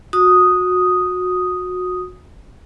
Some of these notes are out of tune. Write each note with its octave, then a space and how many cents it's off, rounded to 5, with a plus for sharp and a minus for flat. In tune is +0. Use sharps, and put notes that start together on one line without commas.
F#4 -25 D#6 +0